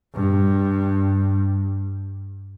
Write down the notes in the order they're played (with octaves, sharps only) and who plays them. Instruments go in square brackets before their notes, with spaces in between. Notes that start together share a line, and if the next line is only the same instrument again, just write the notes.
[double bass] G2